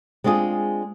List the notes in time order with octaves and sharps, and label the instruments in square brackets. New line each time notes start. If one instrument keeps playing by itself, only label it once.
[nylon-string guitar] G#3 C4 D4 F4 G#4